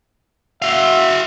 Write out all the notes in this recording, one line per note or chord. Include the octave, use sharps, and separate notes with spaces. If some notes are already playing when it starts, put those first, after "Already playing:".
F#4 E5 F5